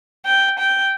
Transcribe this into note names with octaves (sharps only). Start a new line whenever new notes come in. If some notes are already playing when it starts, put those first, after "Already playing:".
G5
G5